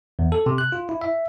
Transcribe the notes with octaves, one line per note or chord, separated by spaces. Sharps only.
E2
A4
C3
F#6
F4
E4
E5